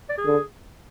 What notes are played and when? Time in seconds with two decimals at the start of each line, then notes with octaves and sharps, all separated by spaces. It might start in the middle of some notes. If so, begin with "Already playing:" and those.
0.09 D5
0.18 G#4
0.26 D3